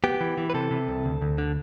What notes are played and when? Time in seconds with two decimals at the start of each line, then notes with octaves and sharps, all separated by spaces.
0.04 B3 G4
0.21 E3
0.38 E3
0.50 B4
0.54 C3 A4
0.71 C3
0.88 C2
1.05 D2
1.21 D2
1.38 D3